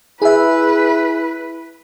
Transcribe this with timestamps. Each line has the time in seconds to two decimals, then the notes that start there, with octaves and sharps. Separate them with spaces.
0.22 E4 G#4 B4 E5